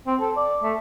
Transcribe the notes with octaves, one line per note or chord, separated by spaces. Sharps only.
C4
A4
D5
A3